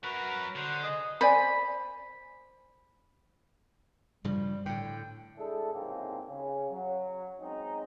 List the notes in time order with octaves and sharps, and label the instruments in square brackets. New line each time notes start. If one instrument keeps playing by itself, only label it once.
[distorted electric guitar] F#3 A#4 [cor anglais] F#4 [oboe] B4
[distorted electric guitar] D3 [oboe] C5 [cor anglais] F#5
[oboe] G#4 [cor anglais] D#5
[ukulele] C5 D5 G#5 [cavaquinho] B5
[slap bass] G2 C#3 F3 [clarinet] G3
[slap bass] A2 D3 [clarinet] G5
[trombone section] G#3 D4 E4 G#4 A4
C2 G#2 C#3 F3 A#3 C4
C#3
F#3
G#3 C4 C#4 D#4